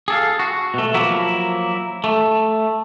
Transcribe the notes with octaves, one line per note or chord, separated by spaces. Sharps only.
G#4 A4 F5
F#4
B2 A3
F3 F#3 A#3 E4 F#4
A3